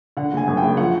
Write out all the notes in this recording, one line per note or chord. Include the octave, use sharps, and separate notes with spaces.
D3 F#5
F#1 G#5
F#2
G5
F#1
F3 F#5